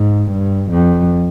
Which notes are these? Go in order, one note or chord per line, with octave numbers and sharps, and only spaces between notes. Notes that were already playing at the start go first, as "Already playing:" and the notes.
Already playing: G#2
G2
F2